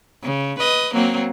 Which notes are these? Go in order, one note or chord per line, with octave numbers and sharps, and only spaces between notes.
C#3
B4 D#5
F#3 A#3 C4